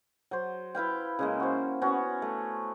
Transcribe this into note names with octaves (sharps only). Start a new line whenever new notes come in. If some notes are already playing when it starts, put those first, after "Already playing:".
F#3 C5
E4 B4 F5 G5
C#3 G#3 A#3
F#4 C5
B3 C#4 F#4
A3